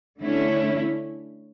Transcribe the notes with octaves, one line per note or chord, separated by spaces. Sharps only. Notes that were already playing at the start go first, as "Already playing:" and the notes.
D3 A3 C#4 E4